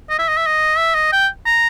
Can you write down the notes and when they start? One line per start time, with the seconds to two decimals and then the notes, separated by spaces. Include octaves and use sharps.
0.10 D#5
0.19 E5
0.28 D#5
0.37 E5
0.46 D#5
0.78 E5
0.95 D#5
1.12 G5
1.46 A#5